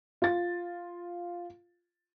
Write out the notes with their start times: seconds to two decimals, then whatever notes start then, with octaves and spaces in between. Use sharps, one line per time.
0.22 F4 A6